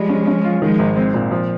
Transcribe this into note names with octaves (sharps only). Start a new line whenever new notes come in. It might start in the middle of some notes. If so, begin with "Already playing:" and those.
Already playing: F3 G3 G#3
C#4
C#4
F4
D#3 F3 G#3
G#1
C4
A#2
F3